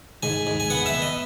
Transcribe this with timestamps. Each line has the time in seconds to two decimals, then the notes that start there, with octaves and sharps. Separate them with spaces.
0.23 G#2 G#5
0.47 G#2
0.60 G#5
0.70 B3 F#5
0.86 E5
0.94 B3
1.02 D#5